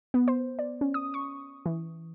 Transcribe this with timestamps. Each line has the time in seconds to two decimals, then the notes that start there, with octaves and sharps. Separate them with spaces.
0.14 B3
0.28 C5
0.59 D5
0.81 C#4
0.94 D#6
1.14 C#6
1.66 E3